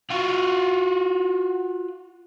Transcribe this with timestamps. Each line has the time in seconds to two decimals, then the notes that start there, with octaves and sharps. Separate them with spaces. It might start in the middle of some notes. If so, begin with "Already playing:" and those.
0.10 F4 F#4